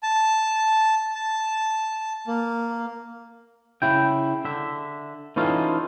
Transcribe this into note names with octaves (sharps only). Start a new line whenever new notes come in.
A5
A5
A#3
C#3 E4 G5
D3 E5
E3 C#4 D#4 F4 A4